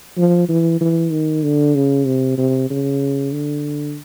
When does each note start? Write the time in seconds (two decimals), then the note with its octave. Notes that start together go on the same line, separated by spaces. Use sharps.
0.17 F3
0.49 E3
0.81 E3
1.12 D#3
1.44 D3
1.75 C#3
2.06 C3
2.38 C3
2.70 C#3
3.32 D3